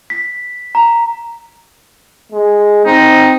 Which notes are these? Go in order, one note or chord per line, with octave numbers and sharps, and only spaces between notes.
B6
A#5
G#3
C4 D#4